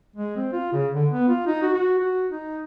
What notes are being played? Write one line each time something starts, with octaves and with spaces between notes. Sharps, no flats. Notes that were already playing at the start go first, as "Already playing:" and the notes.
G#3
C4
F4
C#3
D3
B3
F4
D#4
F#4
F#4
F#4
D#4